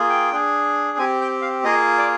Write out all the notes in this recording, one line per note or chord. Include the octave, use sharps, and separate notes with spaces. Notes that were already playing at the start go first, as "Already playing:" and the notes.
Already playing: A#3 F4 G#4
G5
D4 G#4
C4 G4 G#5
G5
F5
A#3 F4 G#4 D#5
D5